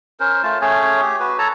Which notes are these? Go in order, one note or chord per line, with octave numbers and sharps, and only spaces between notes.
C#4 A#4 C5
A3 F4 A5
A3 C#4 G#4 C#5
G4
F#4 B4
A4 C#5 A5 A#5